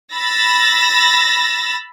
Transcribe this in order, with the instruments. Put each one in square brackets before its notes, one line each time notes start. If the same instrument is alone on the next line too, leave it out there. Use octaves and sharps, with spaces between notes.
[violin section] B5 E6 A6 A#6